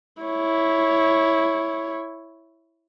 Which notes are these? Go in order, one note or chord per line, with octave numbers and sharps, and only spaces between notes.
E4 C#5